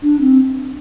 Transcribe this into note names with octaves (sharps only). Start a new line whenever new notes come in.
D4
C4